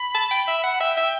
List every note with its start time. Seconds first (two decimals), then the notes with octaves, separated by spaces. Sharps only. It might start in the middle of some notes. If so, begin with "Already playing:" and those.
Already playing: B5
0.14 A5
0.31 G5
0.47 E5
0.64 F#5
0.80 E5 G5
0.97 E5